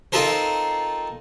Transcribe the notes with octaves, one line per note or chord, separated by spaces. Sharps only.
C4 D#4 F4 A4 A#4 C5